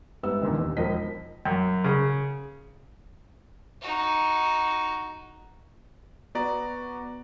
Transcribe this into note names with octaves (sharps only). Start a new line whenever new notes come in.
G#2 G3 B3 E5 E6
E2 A#2 D3 D#3
D#2
E1 F3 A#4 D#5 B6
F#2
C#3
D#4 F#4
B3 F#4 D5 A#5